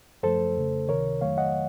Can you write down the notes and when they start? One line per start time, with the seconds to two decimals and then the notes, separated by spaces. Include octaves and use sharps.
0.23 F#2 F3 A3 A4 C5
0.57 F2 C#3 A3
0.88 C#2 C3 D#3 A#4 C#5
1.21 F2 D#3 F#3 A3 C#5 F5
1.38 D#5 F#5